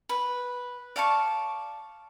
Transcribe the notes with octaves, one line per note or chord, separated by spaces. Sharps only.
B4
D5 F5 A5 C#6